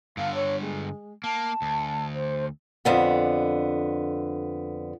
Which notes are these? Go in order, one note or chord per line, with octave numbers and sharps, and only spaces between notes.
G2 D3 F5
C#5
G#3
A#3 A5
D2
C5
F2 D3 B3